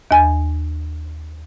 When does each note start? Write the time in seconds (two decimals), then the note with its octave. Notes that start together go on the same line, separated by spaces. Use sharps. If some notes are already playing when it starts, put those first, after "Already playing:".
0.11 D#2 G#5